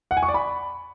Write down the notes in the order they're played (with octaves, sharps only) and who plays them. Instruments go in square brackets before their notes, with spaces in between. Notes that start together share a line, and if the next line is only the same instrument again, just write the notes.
[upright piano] F#5
G#5
C#6
D5
B5